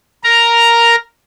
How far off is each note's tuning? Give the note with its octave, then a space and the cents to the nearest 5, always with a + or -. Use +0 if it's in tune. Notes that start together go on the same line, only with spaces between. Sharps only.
A#4 +0 A#5 +0